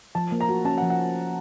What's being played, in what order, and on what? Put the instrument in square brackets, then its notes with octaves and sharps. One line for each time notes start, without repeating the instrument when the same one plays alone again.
[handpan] F3 [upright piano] A5
[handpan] A#3
[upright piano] A#5
[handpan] F#4
[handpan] C#4 [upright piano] A5
[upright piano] F#5
[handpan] F3
[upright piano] F#5